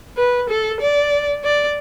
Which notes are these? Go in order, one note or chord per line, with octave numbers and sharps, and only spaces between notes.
B4
A4
D5
D5